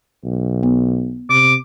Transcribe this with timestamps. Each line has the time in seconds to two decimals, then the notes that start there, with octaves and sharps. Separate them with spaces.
0.24 B1
0.63 B3
1.30 C3 D6